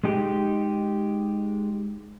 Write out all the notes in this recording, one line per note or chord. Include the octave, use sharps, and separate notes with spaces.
G#3 D#4 G4